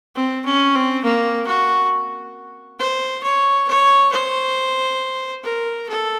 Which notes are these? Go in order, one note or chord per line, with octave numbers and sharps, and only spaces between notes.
C4
C#4
C4
A#3
F#4
C5
C#5
C#5
C5
A#4
A4